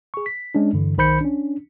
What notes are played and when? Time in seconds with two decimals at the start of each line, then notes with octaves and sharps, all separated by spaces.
0.14 G#4 C#6
0.26 B6
0.55 G#3 C#4 D4
0.73 G2 D3 E3
0.98 B1 D#3 C5 B5 G6 C#7
1.21 C#4 D4